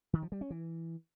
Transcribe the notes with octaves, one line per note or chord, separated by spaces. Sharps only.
D#3
F3
G3
C#4
E3